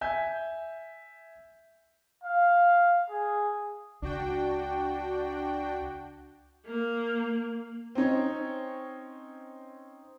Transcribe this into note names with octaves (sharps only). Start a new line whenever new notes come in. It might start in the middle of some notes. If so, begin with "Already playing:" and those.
E5 G#5 G6
F5
G#4
C#2 D4 F#4 G5
A#3
C4 C#4 D#4 C#5